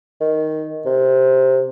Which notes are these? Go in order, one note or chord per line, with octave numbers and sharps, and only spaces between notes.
D#3
C3